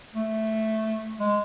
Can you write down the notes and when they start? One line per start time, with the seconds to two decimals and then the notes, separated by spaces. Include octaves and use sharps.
0.15 A3
1.20 G#3